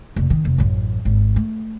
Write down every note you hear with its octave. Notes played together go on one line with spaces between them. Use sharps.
F1 D3
D#3
F1
A1 F#2
G#1
A3